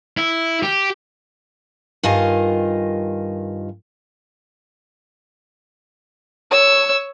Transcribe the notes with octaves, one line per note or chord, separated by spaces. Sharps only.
E4
G4
G2 D#3 F4 A#4 D#5 G#5
C#5 E6